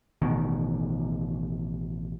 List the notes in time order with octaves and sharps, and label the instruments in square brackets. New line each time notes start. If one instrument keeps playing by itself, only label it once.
[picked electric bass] A1 B2 D#3